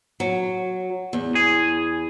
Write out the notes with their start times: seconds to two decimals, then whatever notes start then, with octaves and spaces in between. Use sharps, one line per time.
0.20 F#3
1.13 E2
1.35 G#4